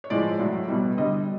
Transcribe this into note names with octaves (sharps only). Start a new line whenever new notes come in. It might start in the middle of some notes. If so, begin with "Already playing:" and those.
C#5
A2 F3 G#3 D5
A2 F#3 A3 E5
B2 G3
D3 G3 D#5